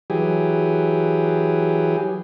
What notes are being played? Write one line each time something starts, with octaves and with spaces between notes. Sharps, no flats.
E3 F#3 G4 G#4